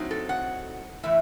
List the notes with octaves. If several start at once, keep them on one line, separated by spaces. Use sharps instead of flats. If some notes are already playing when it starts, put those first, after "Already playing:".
Already playing: A2 F#3 C4 D#4
A4
F#5
A2 E3 E5